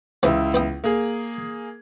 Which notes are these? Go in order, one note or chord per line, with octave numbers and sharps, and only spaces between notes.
C#2 C3 E3 E4
B3 G5 D#6
A#3 G#4